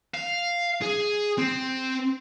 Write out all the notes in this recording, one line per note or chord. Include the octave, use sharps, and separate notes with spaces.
F5
G#4
C4